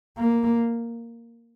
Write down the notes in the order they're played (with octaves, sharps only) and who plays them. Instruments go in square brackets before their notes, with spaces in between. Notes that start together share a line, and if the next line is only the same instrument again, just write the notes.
[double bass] A#3